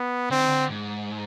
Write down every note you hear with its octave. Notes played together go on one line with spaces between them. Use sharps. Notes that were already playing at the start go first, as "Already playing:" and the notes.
Already playing: B3
D3 C4
D#3
D3
G#2